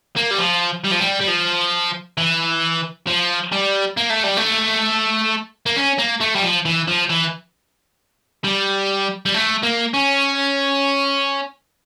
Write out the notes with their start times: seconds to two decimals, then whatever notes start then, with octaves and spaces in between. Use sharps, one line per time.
0.16 A#3
0.31 G3
0.38 F3
0.84 G3
0.91 F3
1.00 G3
1.20 G3
1.28 F3
2.18 E3
3.07 F3
3.52 G3
3.97 A#3
4.10 A3
4.24 G3
4.37 A3
5.66 A#3
5.76 C#4
5.99 A#3
6.21 A3
6.36 G3
6.43 F3
6.65 E3
6.88 F3
7.10 E3
8.44 G3
9.26 G3
9.34 A3
9.63 A#3
9.94 C#4